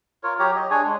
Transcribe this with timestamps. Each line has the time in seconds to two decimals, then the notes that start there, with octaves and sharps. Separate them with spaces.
0.23 F4 A#4 C#5
0.39 F#3 G4 C#5 A#5
0.56 D#5
0.71 D4 G#4 C#5 G#5
0.84 G#3